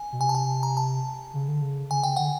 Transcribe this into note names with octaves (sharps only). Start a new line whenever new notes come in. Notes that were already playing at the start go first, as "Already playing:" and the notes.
Already playing: G#5
B2
C3 G#5
A5
G#5
A#5
A5
C#3
D3
C#3
C#3 G#5
C#3 G5
D3 F#5